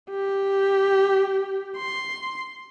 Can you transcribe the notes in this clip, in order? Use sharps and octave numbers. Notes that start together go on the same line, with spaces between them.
G4
C6